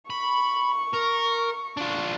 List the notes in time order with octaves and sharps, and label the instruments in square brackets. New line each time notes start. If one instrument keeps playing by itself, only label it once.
[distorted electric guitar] B5 [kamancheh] C#6
[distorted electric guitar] A#4
D4 F4